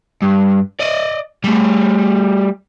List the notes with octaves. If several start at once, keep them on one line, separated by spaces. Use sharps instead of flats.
G2
D5 D#5
G3 A3